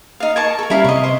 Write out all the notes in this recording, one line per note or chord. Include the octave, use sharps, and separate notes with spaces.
D#4 F5
A#4 A5 C#6 G#6
A4 A#4
G3 C#4 E4 A#4 F5 B5
C3 D#5 C#6
C5